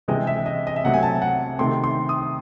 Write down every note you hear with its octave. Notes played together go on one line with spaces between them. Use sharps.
C3 E3 G#3 C4 D#5
E5
D#5
D#5
E5
C3 F#3 A3 C4 F#5
G#5
A5
F#5
C3 D#3 A3 C4 C6
C6
D#6